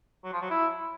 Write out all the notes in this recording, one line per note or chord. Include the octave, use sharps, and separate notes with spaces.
F#3
F3
F#3
E4